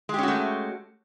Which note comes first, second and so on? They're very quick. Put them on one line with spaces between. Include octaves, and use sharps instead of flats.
G#3 G4 C#4 F#4 A3